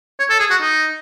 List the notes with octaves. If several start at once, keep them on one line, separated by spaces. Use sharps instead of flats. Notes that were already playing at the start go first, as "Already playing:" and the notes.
C#5
A4
G#4
F#4
D#4